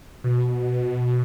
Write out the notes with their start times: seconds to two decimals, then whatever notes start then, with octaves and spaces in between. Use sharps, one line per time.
0.24 B2